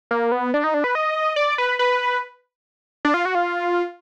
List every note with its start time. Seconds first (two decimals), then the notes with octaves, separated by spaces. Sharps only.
0.11 A#3
0.32 B3
0.54 D4
0.64 D#4
0.74 D4
0.84 B4
0.95 D#5
1.36 D5
1.58 B4
1.79 B4
3.05 D4
3.14 F4
3.25 F#4
3.35 F4